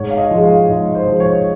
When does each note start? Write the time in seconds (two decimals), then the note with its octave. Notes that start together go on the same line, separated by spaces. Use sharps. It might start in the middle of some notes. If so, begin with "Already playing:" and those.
Already playing: G#2 C#5
0.10 F5
0.18 D#5
0.30 F3 G#3
0.44 F5
0.68 G#2 D#5
0.95 C5
1.07 F3 G#3
1.20 C#5